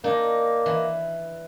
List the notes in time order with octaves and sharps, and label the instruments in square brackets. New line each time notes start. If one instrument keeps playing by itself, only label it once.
[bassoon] A#3 [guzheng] D4 D#4
[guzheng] E3